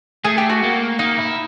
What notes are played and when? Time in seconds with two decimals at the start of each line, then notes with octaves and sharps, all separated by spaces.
0.24 A3 G#4
0.38 G4
0.49 F#4
0.63 A#3
0.99 A#3 D#4
1.18 E4